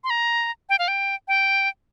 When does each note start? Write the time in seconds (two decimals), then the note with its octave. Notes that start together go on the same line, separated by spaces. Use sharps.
0.04 C6
0.10 A#5
0.69 G5
0.79 F5
0.88 G5
1.28 G5